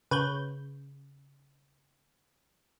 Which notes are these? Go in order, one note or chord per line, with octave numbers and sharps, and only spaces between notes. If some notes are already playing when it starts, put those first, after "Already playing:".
C#3 B4 C#5 G6